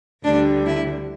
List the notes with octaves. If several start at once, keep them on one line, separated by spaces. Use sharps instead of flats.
D2 D3 G3 D4
E4